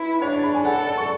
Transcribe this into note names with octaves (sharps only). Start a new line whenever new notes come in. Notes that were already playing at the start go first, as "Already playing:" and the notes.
Already playing: E4 B4
D4 C#5
D5
B5
G#5
A4 F#5
D5
D5
C#6